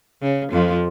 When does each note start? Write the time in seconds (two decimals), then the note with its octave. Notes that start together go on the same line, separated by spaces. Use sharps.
0.22 C#3
0.52 F2 F3